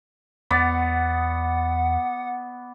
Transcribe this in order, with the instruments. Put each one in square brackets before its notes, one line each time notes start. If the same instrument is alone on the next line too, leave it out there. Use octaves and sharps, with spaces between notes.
[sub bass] E2 [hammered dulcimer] B3 D5 [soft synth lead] F#5